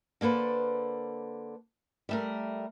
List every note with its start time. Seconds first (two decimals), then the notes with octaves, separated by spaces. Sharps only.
0.21 D3 A#3 A4 B4 C5
2.09 G3 A3 A#4